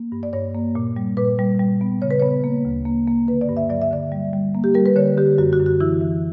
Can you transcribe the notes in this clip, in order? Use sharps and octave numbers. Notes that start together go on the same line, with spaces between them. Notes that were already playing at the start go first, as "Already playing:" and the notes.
Already playing: A#3
G2
D5
G2 C#5
A#3
A#2
G3
A#2 B4
G3
G3
B3
C#3 C#5
B4
B3 C#5
A#3
D2
A#3
A#3
D3 B4
D5
G2
E5
F#3 D5
E5
D3 D5
G3
G3
A#3
G4
G3 A#4
B4
D3 C#5
D3 G4
F#2 F#4
F#4
F#2
F#4
E3 E4
E3